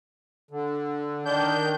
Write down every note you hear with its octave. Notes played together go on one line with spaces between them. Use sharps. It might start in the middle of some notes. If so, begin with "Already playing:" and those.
D3
D#3 D4 G6